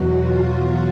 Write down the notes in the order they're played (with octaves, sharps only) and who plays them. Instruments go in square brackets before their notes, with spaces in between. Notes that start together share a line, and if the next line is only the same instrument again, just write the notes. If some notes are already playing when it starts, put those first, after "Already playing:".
Already playing: [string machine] E2 B2 F#3 F#4
F4